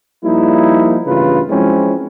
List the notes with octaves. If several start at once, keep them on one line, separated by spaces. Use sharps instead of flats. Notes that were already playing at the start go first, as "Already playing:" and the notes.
F3 G3 A#3 D#4 E4
A1 G2 C#3 E3 F4 B4
F3 F#3 G#3 C4 C#4 E4